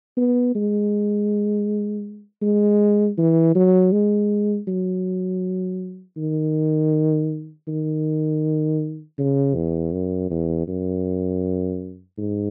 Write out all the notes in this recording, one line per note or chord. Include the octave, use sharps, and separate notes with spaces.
B3
G#3
G#3
E3
F#3
G#3
F#3
D#3
D#3
C#3
E2
F#2
E2
F#2
G#2